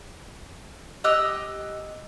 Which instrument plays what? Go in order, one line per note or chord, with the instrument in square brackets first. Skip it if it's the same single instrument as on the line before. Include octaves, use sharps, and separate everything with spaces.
[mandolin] G4 D#5 E6 F#6